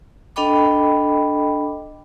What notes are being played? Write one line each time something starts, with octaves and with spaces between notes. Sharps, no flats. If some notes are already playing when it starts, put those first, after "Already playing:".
D4 A4 D#5 G5 B5 D6